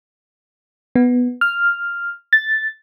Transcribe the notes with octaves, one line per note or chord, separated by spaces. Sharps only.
B3
F6
A6